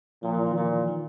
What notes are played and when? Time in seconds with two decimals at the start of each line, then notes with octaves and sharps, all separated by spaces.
0.23 A#2 F3
0.34 E3
0.47 D#3
0.55 A#2 E3
0.87 D#3